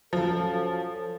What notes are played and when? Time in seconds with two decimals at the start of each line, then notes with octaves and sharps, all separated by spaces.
0.13 F3 F#3 C#4 A4